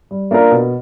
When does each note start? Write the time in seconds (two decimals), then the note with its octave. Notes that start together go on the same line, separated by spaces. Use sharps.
0.11 G3
0.31 A#3 D4 F4 A#4
0.51 B2